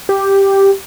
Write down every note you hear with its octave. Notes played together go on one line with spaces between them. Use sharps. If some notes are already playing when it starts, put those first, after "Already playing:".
G4